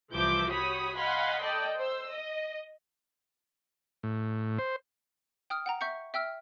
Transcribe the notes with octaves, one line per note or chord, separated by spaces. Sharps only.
C2 E3 F3 E5 D6 G6
F#4 G4 C#5 B5 D#6
D#5 F5 F#5 G#5 B5 C6
A4 D5 D#5 G5
C5 E6
D#5
A2
C5
G5 D#6 F6
F#5 G5 A#5
E5 C#6 G6 C#7
E5 G5 E6 F6